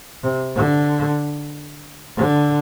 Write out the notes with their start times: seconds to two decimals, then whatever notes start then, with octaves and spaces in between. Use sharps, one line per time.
0.23 C3
0.56 D3
2.17 D3